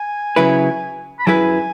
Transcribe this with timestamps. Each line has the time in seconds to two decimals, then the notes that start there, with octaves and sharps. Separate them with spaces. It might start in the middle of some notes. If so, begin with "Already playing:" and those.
Already playing: G#5
0.36 C#3 F#3 E4 B4
1.19 B5
1.26 F#2 F#3 E4 G#4 B4 G#5